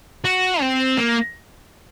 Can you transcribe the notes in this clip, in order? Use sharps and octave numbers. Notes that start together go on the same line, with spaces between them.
F#4
C4
A#3